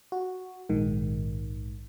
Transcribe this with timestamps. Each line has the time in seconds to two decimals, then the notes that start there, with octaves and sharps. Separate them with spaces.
0.12 F#4
0.69 A#1 G#2 D#3